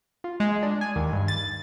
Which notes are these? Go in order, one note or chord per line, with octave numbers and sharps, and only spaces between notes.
F4
G#3
D4
G#5
D#2
G2
A6